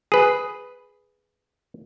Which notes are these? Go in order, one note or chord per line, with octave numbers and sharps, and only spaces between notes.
G#4 B4